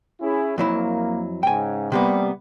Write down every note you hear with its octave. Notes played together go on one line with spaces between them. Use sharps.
C#4 E4 G#4
F2 F#3 A#3 E4
G#2 C#3 G5 G#5
C3 G3 A#3 B3